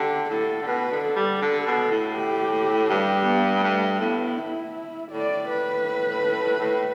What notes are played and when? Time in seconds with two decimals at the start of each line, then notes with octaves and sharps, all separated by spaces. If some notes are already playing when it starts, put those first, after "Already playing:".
Already playing: D3 G4
0.30 A2 A4
0.62 D3
0.67 B2 B4
0.91 D3
1.04 A4
1.16 G3
1.40 D3 A4
1.66 B2
1.91 A2
2.14 G4
2.89 G2 G4
3.26 B3
3.63 G2 A3
4.00 A2 B3
4.38 E4
5.12 A2 D5
5.49 B4
6.59 A2